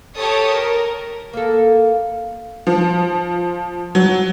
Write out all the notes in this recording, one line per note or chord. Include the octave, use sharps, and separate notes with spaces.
G4 A4 C#5 A5 D#6
A#4
A#3 A4
F3
F#3